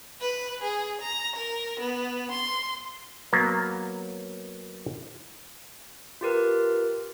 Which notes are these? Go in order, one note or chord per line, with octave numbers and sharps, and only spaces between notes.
B4
G#4
A#5
A#4
B3
C6
F#3 A#3 B3
F4 G4 A#4 B4